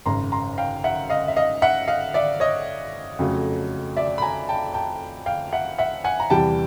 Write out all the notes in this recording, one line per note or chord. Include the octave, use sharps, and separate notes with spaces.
G#1 F#2 C#3 A#5 C6
A#5 C6
F5 G5
E5 F#5
D#5 F5
E5
D#5 F5
E5 F#5
D#5 F5
D5 E5
C#5 D#5
F2 C#3 F#3 A3
D5 E5
B5
G#5 A#5
G5 A5
G5 A5
F5 G5
E5 F#5
E5 F#5
F#5 G#5
A#5
E2 C3 E3 G3 G5 A5